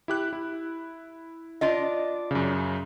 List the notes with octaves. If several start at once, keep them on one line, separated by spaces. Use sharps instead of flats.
E4 G4 F#6
E4
D4 F4 D#5
F#2 C#3